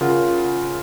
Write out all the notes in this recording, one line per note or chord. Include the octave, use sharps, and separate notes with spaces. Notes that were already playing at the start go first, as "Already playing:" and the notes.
C#3 F4 A#4 F#5